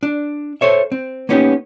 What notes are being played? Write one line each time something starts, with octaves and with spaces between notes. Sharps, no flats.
D4
A4 C5 C#5 E5
C4
A#3 B3 C#4 D#4 F#4 G4